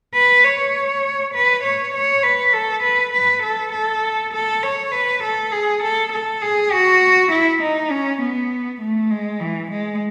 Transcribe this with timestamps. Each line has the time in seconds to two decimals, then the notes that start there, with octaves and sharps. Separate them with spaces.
0.14 B4
0.44 C#5
1.34 B4
1.64 C#5
1.94 C#5
2.23 B4
2.53 A4
2.83 B4
3.14 B4
3.43 A4
3.73 A4
4.33 A4
4.63 C#5
4.92 B4
5.23 A4
5.52 G#4
5.83 A4
6.12 A4
6.42 G#4
6.72 F#4
7.31 E4
7.62 D#4
7.91 C#4
8.22 B3
8.81 A3
9.10 G#3
9.40 E3
9.71 G#3